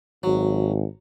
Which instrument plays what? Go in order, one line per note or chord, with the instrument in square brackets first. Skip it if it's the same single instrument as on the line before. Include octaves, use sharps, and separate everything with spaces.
[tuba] G#1 [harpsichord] F#3